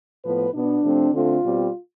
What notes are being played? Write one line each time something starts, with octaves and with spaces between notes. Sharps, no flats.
A2 F3 B3 B4
B2 B3 D4
C3 F3 A3 C4
D3 A3 C4 F4
B2 G3 C4